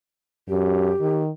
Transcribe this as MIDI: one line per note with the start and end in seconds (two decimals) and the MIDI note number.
0.49 0.92 42
0.49 1.19 67
1.00 1.31 51